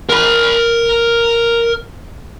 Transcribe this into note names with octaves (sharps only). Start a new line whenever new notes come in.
A#4 B5